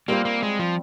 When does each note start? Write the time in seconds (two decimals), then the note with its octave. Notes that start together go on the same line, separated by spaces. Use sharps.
0.08 G3 A#3 C4 F4 C5
0.25 A#3
0.43 G#3
0.59 F3